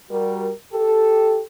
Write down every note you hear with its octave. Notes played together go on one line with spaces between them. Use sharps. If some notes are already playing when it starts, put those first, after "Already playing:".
G3 F#4 A#4
G4 A4